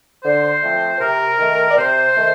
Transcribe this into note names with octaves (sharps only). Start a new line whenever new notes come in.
D3 C5
F3 A3 C4
C3 A#4
D#3 A3
D5
C3 C5
D#3 A3